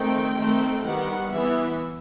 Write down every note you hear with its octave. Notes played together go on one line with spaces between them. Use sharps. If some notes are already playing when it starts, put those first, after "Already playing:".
Already playing: D#3 A3 C4 G5
D#3 A3 C4
D#3 G3 B3 F#5
E3 B3 E5